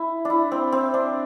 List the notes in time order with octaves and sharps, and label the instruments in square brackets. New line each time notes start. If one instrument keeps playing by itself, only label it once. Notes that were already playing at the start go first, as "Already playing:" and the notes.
Already playing: [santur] E4
D4 E4
C4
C4
D4